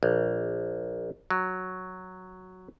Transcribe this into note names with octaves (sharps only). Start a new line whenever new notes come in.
A#1
F#3